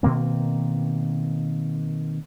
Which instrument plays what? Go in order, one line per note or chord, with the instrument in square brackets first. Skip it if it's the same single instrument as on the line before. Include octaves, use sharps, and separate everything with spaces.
[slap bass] B2 D#3 A#3 C4